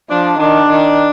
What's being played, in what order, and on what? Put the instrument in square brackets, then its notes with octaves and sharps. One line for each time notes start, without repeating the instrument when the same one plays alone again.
[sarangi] F3 [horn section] D4
[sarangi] D#3 [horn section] D4
[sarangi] D#3